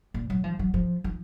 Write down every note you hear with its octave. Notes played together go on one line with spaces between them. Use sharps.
A#2
F#3
F3
F#3
F3
F3